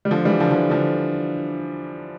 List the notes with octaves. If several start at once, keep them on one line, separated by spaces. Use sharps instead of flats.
G3
D3 F3
E3 G3
D3 F3
F3
E3
D3 F3